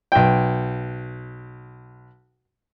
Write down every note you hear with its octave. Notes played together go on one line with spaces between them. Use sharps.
B1 G5